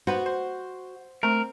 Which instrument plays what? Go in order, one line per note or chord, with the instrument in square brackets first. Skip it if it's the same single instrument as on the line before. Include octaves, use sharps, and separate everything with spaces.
[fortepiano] B3 B4 C5 [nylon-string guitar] F#4
[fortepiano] C5
[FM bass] A3 [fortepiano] C4 [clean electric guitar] A#4